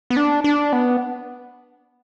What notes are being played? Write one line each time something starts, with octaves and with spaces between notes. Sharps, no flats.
B3
D4
D4
B3